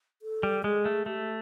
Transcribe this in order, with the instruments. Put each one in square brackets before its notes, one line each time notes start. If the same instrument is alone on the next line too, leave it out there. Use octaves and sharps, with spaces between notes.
[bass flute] A4
[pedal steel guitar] G3
[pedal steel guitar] G#3 [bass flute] G#4
[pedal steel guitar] A3
[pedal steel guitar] A3 [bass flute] G4